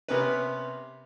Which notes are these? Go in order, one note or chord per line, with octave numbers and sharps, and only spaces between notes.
C3 B3 C#4 A#4 B4